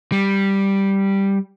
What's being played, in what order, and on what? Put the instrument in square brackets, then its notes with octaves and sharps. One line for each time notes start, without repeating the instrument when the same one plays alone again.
[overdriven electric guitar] G3